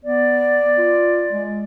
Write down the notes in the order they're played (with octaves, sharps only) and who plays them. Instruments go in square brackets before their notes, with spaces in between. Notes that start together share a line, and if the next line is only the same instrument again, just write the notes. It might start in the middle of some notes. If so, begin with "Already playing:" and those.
[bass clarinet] B3 [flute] D5
[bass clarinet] F4
G#3